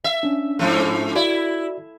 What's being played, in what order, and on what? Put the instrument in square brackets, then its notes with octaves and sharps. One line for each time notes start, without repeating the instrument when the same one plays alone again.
[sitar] E5
[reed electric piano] C#4 D4
[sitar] G#2 F3 A3
[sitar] E4 [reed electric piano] F#4 D5 E5